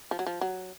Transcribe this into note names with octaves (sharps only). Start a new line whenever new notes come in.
F3
F#3
F3
F#3